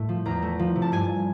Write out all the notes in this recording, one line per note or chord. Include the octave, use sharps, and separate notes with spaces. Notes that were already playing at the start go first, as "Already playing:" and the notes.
Already playing: A2 A3
F3
E2 A#5
A3
F3
C3
A5
G2 G#5